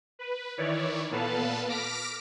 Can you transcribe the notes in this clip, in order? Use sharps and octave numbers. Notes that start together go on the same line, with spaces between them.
B4
D#3 E3 E4 C#5 D5
A#2 B3 A4 B4 F5 A5
D6 F6 A#6 B6 D7